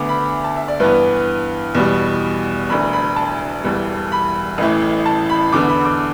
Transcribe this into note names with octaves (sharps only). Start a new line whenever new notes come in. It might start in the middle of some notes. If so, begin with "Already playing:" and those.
Already playing: D2 D3 B3 D6
B5
A5
E5
D5
G2 E3 B3 B4
E2 B2 G3
E1 D2 D3 B5
B5
A5
E1 E2 E3 G3
B5
A1 A2 E3
A5
B5
E2 D3 B3 D6
B5
D6